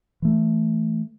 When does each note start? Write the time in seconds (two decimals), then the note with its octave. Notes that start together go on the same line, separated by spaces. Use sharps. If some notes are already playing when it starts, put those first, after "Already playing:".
0.22 E3 A3